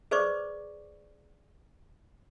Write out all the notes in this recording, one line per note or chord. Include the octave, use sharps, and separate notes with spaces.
G#4 B4 C5 D5 C#6 D6